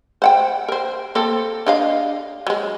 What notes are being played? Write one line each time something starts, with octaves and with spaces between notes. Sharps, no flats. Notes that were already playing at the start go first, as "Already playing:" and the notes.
C5 F#5 G5
A#4 C5
A#3 C4 A4
D4 D#5 F5
F#3 G#3